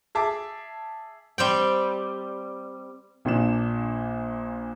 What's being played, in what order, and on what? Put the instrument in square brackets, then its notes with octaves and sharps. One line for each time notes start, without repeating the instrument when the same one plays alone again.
[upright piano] G#4 E5 A5 D6
[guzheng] G3 C4 G5
[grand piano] A#1 A#2 D4 E7